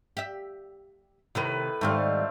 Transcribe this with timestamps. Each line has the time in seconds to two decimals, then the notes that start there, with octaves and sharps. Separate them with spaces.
0.17 G4 E5
1.35 A2 C3 D#3 A#4 B4
1.81 G#2 D#3 G3 A3 C4 F5